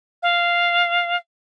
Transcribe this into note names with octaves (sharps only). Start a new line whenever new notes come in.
F5